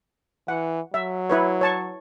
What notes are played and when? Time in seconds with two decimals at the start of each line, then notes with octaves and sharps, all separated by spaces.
0.48 E3 F#5
0.94 F#3 E5
1.30 E4 B4 C#5
1.61 C#5 A5 C#6